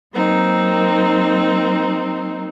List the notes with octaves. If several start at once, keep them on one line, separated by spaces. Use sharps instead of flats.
F#3 A#3 C4 D#4